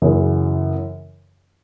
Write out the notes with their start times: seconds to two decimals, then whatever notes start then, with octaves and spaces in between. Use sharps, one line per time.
0.02 F#2 C#3 E3